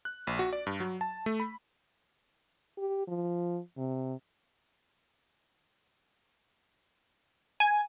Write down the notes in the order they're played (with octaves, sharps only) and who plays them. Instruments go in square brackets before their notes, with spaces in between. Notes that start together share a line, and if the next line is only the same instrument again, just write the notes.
[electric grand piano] F#6
A#1
F#4
D5
G2
F#3
A5
A3
B5
[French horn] G4
F3
C3
[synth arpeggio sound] G#5